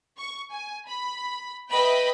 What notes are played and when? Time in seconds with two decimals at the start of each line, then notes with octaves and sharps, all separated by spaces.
0.18 C#6
0.52 G#5
0.87 B5
1.72 B4 D#5 E5 G5 B5